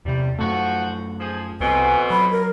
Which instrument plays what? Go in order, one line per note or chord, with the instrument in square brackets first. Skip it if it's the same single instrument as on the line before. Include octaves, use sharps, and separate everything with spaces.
[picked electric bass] E2 C3 [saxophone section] G3
[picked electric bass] F#2 A3 [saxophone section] F3 F#4
[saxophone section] F3 G#4
[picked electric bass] C2 [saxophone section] F2 B2 [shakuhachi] G#5
[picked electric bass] F#3 [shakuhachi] B5
[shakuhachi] A#4